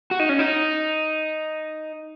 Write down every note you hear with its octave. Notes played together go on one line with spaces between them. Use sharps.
F#4
D#4
C#4
D#4